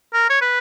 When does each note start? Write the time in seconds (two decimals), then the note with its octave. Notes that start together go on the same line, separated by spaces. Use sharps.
0.13 A#4
0.30 C#5
0.41 B4